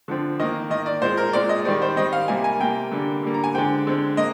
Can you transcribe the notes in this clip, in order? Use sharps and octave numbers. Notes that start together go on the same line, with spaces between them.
D3 F3 C4
D#3 A#3 D#5
D#3 A#3 D#5
D5
A#2 G#3 C4 C5
A#4
A#2 G#3 C4 D5
D#5
D#3 G3 C4 D5
C5
D#3 G3 C4 D#5
F5
C3 G3 A#3 G#5
G#5
C3 G3 A#3 G5
D3 G3 A#3
D3 G3 A#3
A#5
G#5
D3 G#3 C4 G5
D3 G#3 C4
A#3 D#5